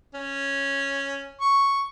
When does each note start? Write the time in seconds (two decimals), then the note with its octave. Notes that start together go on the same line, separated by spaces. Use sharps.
0.15 C#4
1.41 C#6